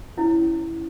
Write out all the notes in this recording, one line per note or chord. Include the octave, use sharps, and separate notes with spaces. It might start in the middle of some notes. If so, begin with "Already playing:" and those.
C#4 E4 C#5